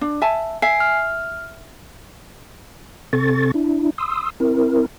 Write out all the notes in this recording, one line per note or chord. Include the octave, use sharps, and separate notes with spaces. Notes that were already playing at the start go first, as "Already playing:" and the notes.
D4
E5 G#5 A5
E5 G#5 C7
F6
C3 C4 A4 C#6 A6
D4 E4
C6 D#6 E6
C4 E4 A#4